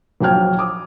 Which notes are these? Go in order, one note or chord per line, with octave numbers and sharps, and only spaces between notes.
A#1 F3 F#3 G5 F6 G#6
D6 D#6